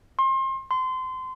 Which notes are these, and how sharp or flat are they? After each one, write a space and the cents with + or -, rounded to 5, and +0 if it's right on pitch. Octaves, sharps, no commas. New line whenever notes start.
C6 +35
C6 -25